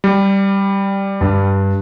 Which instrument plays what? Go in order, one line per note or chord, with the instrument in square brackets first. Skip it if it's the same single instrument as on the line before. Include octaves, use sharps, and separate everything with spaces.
[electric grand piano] G3
[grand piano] G2